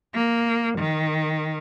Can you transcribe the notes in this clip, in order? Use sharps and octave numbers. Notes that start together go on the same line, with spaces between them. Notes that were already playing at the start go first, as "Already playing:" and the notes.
A#3
D#3